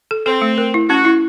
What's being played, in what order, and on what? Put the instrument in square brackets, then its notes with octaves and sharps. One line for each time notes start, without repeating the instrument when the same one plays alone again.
[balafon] A4
[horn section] C4 [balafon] A4
[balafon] A3
A#4
E4
[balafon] C#4 [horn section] F#4
[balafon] E4